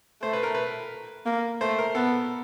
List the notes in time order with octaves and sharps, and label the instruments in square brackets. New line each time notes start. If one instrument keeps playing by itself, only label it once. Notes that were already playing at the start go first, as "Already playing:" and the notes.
[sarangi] A3 [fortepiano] C5
[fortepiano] B4
A#4
B4
[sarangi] A#3
[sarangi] A3 [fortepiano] C5
[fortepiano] A#4
[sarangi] B3 [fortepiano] A4